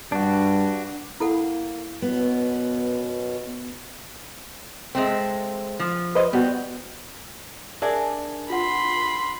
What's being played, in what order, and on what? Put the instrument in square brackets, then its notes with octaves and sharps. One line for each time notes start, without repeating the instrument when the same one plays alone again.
[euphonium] G2 [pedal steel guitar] D4 F#4
[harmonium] A#3 [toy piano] E4 A4 F#5
[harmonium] F#2 B2 [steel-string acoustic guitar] B3
[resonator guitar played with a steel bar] G#3 A3 C4
F3
[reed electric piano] B4 C5 D#5
[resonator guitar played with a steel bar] G3 [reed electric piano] B3 F#4
[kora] D4 G#4 [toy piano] A#4 E5 G#5
[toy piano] F4 F#5 [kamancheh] B5 C6